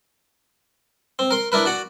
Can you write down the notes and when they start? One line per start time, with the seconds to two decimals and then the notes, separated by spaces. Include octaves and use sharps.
1.19 C4
1.31 A#4 C6
1.52 D4 E4 A#4 B4
1.65 F#4 D5 F#5